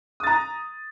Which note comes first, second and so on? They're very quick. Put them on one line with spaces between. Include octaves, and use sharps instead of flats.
D#6 A6 A#5